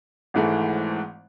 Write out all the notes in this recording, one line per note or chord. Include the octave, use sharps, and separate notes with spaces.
G#1 G#2 E3 A3